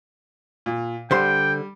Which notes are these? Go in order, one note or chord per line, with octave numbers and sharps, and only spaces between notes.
A#2
D3 G3 C5 G5 C6